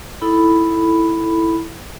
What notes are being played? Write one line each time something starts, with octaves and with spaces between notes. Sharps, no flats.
D#4 E4 A4 B5